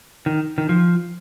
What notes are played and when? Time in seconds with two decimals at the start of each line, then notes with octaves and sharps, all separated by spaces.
0.26 D#3
0.58 D#3
0.69 F3